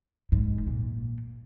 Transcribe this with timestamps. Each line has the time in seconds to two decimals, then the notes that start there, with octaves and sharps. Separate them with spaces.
0.32 G#2
0.67 A#2